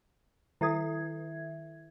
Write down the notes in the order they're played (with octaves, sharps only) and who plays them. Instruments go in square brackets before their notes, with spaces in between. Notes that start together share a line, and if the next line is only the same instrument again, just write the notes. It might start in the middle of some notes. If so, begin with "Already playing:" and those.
[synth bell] D#3 E5 G#6 [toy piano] E4 A4 D#6